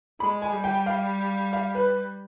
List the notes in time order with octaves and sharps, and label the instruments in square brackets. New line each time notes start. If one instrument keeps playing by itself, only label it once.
[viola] G#3 [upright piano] B5
[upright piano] G#5
[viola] G3
[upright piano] G5
F5
F5
B4